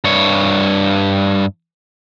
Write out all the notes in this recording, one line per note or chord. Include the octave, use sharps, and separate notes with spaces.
G2 C#5